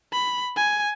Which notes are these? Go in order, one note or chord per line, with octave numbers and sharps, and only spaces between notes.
B5
G#5